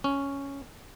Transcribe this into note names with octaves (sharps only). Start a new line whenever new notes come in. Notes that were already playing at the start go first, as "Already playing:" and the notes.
C#4